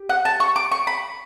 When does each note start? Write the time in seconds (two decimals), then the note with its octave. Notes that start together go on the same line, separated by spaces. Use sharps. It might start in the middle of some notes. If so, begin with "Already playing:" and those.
Already playing: G4
0.09 F#5
0.25 A5
0.40 C#6
0.56 D6
0.71 C#6
0.87 B5